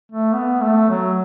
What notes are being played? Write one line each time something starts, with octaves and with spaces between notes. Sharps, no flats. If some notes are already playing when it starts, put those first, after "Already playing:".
A3
B3
A3
F#3